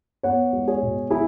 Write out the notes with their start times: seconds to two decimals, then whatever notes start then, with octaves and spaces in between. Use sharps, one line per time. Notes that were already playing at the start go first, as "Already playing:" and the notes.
0.23 B3 C#5 F#5
0.53 G#3
0.68 G#4 C#5
0.82 B2
1.10 E4 G#4